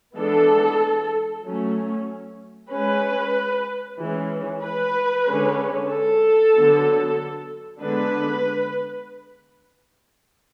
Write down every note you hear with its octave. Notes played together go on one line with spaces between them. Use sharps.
E3 G#3 B3 D4 A4
F#3 A3 C#4
G#3 C#4 B4
E3 G#3 C#4
B4
D3 G#3 C#4
A4
D3 F#3 B3
D3 G#3 B3 D4 B4